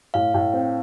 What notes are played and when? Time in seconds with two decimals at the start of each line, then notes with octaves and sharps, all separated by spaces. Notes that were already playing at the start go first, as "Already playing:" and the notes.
0.14 A2 F5
0.34 A2
0.53 C4